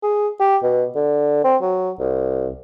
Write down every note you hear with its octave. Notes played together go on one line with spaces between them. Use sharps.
G#4
G4
B2
D3
C4
F#3
C2